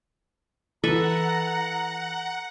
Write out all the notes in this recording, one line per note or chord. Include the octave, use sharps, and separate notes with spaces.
E3 A4 B4 E5 F#5 A#5